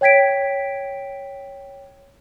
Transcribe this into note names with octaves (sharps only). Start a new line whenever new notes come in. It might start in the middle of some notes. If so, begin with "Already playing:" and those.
C#5 G5 G#6 B6 D7